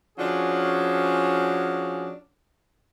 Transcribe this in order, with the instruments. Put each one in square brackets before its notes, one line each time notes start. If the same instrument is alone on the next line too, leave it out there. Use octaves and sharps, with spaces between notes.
[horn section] F3 C#4 D4 F#4 G#4